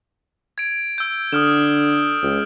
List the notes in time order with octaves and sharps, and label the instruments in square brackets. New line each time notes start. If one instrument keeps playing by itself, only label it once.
[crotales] G#6 D7
E6 G6
[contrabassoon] D3 [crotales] D#6 F6 E7
[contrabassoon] C#2